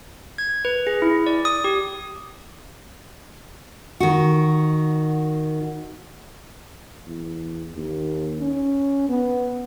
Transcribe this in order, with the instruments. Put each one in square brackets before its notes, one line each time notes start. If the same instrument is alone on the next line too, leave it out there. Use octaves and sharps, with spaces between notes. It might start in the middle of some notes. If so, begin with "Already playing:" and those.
[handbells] G#6
B4
G#4
E4
D5
D#6
G4
[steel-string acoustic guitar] D#3 F#4
[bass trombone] E2
D#2
C#4
B3